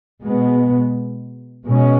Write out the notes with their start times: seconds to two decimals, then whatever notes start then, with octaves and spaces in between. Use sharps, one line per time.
0.21 B2 G#3 B3
1.66 B2 G#3 C#4